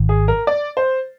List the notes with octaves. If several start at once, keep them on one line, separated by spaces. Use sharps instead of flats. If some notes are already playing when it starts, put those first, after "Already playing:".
Already playing: G#1 G#2 D#3
G#4
A#4
D5
C5